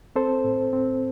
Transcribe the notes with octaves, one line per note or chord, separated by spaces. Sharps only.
C4 A4 C5
A2
C4